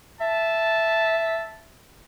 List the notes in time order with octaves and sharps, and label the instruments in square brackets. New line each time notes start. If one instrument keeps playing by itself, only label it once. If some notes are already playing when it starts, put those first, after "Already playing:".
[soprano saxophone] E5 [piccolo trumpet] A5